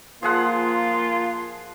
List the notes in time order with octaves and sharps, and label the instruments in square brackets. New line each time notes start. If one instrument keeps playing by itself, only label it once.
[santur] F3 G#4 F#5 [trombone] A#3 [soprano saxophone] F4